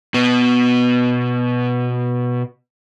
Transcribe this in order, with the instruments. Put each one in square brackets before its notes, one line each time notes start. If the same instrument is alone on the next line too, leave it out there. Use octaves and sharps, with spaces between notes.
[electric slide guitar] B2 B3